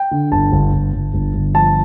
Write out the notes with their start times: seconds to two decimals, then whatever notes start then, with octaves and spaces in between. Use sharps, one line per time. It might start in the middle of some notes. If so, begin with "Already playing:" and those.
Already playing: G5
0.11 D3
0.32 G1 A5
0.52 G1
0.73 G1
0.93 G1
1.14 G1
1.34 G1
1.54 F3 A5